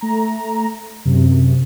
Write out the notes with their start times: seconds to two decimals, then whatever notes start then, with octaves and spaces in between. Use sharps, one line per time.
0.01 A3 A#5
1.05 F#2 C3